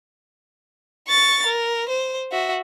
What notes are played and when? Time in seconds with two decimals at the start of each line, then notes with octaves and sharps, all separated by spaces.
1.08 C#6 A6
1.46 A#4
1.89 C5
2.32 F#4 E5